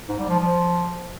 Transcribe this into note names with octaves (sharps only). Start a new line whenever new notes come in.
G#2
G3
F3
F3